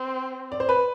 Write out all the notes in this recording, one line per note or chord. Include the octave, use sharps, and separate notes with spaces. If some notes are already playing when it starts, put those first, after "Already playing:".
Already playing: C4
D5
C5
B4